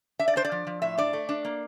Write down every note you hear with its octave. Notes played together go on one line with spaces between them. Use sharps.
D4 E5
D5
D4 C5
D5
F3
F3
A2 E5
D4 D5
A3
D4
A#3